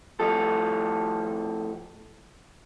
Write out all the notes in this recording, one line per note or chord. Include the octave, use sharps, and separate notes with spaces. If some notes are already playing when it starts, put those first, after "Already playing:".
A2 F3 A4